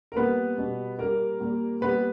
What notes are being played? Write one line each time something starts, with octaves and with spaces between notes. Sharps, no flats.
A#4
A#2 G3 B3 B4
B2 G3
A#2 G3 A#3 A#4
A#2 G3
A#2 G3 B3 B4